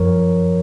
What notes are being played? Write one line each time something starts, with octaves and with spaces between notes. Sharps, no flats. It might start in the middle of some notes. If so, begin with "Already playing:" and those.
Already playing: F#2 F3 A#4 C#5